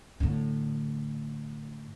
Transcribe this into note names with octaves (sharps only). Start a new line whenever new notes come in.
A2 D3